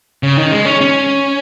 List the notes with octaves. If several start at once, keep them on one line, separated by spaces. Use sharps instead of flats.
C#3
D#3
G#3
C#4
C#4